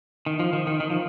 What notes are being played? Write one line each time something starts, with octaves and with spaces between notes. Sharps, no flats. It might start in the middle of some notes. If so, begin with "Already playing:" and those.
D#3
F3
D#3
D#3
D#3
F3